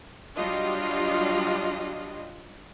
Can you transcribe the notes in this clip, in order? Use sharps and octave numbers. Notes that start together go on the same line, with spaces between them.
F#3 G3 D4 F4 D#5